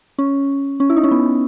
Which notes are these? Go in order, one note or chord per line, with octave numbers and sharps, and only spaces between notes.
C#4
C#4
E4
D#4
C#4
B3